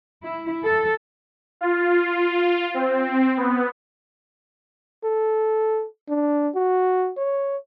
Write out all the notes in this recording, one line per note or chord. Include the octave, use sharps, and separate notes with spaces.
E4
A4
F4
C4
B3
A4
D4
F#4
C#5